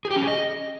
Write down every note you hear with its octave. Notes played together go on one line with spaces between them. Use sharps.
G#4
G4
C#4
G#4
D#5